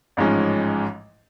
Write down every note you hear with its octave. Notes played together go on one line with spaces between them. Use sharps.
A1 G#2 F3 G#3 C#4